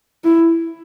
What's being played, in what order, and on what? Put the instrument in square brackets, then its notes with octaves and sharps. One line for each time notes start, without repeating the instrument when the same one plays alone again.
[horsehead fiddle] E4